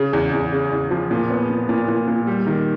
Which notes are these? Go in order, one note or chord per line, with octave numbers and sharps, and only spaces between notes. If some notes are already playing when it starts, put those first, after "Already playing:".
Already playing: C#3
E2
E2
C#3
E2
F3
A#2
B3
A#2
A#2
A#2
A#2
G3
D#3